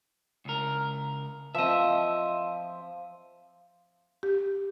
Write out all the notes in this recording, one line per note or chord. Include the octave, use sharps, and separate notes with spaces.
C#2 A#4
F3 C4 D#5 E5
G4